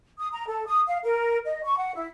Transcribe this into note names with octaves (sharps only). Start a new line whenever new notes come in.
D#6
A#5
A4
D#6
F5
A#4
D#5
C#6
F#5
E4